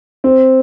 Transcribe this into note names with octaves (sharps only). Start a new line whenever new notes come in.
C4